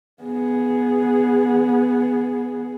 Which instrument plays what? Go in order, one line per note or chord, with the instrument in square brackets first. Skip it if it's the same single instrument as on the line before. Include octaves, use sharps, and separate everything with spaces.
[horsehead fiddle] B3 G#4